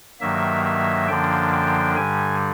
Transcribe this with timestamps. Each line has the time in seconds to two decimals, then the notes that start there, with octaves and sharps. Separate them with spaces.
0.20 G2 D#3 F#3 A#3 E5
0.64 E5
1.08 F#2 D3 F3 A#3 D4 G5
1.52 G5
1.96 G2 D3 G3 G#5